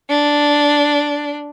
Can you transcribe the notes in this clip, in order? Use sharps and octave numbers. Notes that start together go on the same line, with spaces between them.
D4